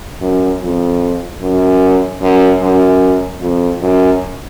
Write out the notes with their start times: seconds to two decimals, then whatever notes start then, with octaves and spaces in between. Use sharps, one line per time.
0.21 F#2
0.61 F2
1.41 F#2
2.21 F#2
2.61 F#2
3.41 F2
3.82 F#2